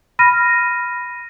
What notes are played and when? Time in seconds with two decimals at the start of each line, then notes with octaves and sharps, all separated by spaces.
0.19 B5 F6 A#6 D#7